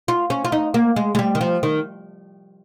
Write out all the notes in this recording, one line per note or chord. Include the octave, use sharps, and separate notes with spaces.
F4
C#4
F4
D#4
A#3
G#3
G#3
G3
D#3
F3
D#3